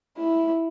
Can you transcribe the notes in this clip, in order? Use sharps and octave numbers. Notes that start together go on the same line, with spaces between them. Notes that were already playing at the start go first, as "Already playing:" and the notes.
E4